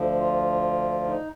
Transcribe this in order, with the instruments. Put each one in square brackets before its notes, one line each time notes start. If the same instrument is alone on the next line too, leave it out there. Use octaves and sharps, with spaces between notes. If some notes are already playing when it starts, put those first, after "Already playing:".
Already playing: [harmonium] D2 D3 F3
F4
D#4